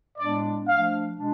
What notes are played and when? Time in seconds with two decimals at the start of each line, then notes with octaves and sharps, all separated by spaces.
0.19 A2 G#3 B3 D4 D5
0.67 F3 A3 D4 F5
1.16 B2 G#3 D4